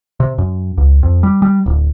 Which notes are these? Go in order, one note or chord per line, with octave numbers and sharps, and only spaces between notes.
C3
F#2
C#2
F2
G3
G3
D1